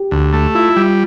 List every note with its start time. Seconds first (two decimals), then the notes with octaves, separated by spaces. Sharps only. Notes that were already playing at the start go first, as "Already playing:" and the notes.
Already playing: G4
0.11 D2
0.33 A3
0.55 E4 F4
0.76 G3